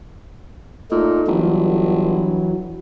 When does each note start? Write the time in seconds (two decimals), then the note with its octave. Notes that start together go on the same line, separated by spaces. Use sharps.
0.91 A#2 A3 D#4
1.27 G1 E3 F#3